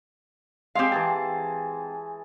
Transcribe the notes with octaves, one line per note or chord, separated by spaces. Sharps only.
G#3 C4 G4 F5
E3 G#4 A5